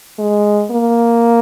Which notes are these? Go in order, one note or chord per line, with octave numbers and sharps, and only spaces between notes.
G#3
A#3